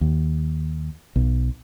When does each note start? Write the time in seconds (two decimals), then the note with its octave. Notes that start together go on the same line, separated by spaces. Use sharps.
0.01 D#2
1.16 B1